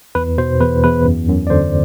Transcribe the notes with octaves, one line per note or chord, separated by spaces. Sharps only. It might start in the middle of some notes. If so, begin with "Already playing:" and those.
E2 B4
B2 C5
E2 B4
E2 B4
F#2
F#2
D5
D3 C5